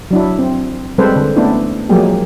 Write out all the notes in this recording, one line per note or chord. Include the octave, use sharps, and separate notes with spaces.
F#3 D4 E4
C4
G3 G#3 C4 A4 B4 C5
D3
A3 B3 C#4 D4 E4
F3 F#3 G#3 A#3 G4 G#4